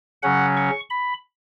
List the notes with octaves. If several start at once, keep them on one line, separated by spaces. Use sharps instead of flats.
C#3 F#3 C#4 F#5
C#6
B5